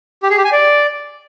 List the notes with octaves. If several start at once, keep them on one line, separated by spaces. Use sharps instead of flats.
G4
G#4
G4
G#5
D5